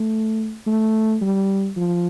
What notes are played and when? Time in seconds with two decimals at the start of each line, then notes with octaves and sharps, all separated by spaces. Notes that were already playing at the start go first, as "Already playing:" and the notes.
Already playing: A3
0.67 A3
1.21 G3
1.77 F3